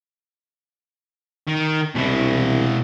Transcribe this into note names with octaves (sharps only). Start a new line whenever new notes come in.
D#3
C2 B2 E4